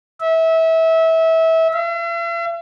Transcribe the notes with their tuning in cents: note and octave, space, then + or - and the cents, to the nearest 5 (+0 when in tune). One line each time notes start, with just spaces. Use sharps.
E5 -25
E5 +45